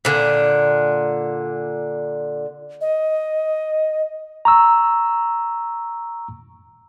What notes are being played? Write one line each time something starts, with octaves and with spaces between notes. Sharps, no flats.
A#2 D3
D#5
A#5 C#6 E6